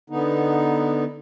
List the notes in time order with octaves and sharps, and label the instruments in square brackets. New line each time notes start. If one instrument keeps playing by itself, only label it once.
[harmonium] D3 B3 D#4